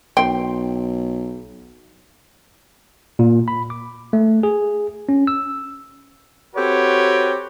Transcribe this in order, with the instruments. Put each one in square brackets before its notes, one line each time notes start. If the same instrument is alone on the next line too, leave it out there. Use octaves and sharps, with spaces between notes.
[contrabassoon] B1 [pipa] G5 C6
[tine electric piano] A#2
B5
D6
A3
G#4
C#4
E6
[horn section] C4 F#4 G4 A4 B4 C#5